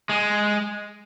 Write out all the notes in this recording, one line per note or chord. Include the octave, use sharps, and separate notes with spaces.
G#3